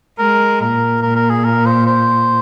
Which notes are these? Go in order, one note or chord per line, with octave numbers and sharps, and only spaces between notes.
G#3 A#4
A#2 A#4
A#2 A#4
A#4
G#4
A#4
C5
C5